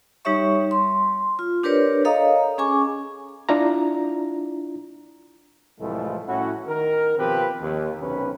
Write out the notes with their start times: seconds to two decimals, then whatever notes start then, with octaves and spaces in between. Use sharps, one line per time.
0.25 G3 D#4 G4 C#5 E5 C#6
0.71 C6
1.39 F4
1.63 D4 G4 A#4 B4 C#5 D5
2.05 A4 C#5 D#5 F5 A#5 D#6
2.58 C#4 G#4 G#5 C#6 D6
3.49 D4 E4 F4 A#5
5.79 C2 A2 E3 F3 G#3 A3
6.27 A2 C#4 E4 F#4
6.67 D#3 A#4
7.18 B2 F3 C4 G4 B4
7.61 D#2
8.00 B1 C3 C#4 B4